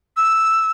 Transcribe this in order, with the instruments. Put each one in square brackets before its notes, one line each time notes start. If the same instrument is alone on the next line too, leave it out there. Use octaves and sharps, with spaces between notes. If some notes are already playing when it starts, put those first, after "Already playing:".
[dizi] E6